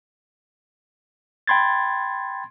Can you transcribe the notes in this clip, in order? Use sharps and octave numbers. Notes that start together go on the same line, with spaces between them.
G5 B5 C6 G#6 A6